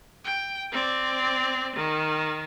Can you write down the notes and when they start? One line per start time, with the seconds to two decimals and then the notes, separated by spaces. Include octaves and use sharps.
0.25 G5
0.72 C4 D5
1.76 D#3